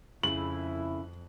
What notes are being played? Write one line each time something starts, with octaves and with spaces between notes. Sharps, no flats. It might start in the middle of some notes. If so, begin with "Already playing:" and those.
F2 C#3 A3 E4 F#7